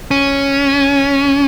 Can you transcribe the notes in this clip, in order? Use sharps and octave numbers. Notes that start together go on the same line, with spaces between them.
C#4